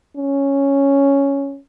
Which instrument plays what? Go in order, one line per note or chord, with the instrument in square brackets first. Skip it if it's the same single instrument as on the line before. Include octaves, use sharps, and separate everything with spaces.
[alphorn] C#4